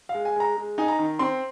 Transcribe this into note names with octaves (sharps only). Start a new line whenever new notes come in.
F5
G#3
G#5
G#3 A#5
G#3
D#4 G#5
A#5
D#3
C4 C6